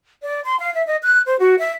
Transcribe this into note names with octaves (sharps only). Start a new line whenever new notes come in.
D5
C6
F5
E5
D#5
F#6
C5
F#4
E5